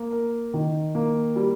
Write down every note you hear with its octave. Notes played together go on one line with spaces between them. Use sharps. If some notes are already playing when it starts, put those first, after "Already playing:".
Already playing: A#3
A#4
D#3
A#3
G3